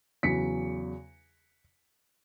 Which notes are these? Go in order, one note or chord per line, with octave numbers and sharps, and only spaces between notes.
E2 C#3 F#3 B6 C#7